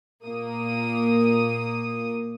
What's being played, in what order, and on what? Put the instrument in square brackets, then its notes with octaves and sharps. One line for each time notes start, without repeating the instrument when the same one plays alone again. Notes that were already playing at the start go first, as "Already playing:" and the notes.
[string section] A#2 A#3 D#6